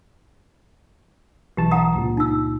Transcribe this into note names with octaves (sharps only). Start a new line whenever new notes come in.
B1 E3 G4 A5
F#5 A#5 D#6
C#2 G2 A#2
D#4 E6